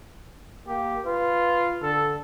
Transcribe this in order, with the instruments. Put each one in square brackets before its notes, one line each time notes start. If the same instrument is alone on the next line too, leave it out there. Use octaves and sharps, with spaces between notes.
[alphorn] A#3 [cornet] G4
[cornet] F4 [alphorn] B4
[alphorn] D3 [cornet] A4